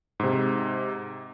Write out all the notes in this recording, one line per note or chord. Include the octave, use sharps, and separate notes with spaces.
G#2 C3